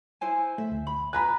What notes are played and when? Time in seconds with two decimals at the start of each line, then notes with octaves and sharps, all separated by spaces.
0.21 E4 C5 G#5
0.58 A3 E5
0.71 D2
0.87 B5
1.13 B4 G#5 A#5 B5 F#6